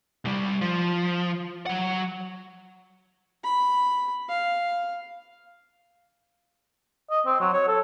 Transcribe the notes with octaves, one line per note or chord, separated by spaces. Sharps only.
C2 G3
F3
F#3 F#5
B5
F5
D#5
C4
F#3
C#5
A4